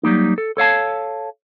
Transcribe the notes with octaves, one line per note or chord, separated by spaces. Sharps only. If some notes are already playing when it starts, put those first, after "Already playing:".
F#3 G3 A#3 D#4
A4
A4 C#5 F5 A5